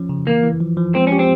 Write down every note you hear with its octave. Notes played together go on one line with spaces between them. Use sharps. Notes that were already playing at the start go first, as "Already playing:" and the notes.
Already playing: F3 C#4
C#3
E3 A#3
E3
F3
F3
G#3 C4
C#4
G4
C4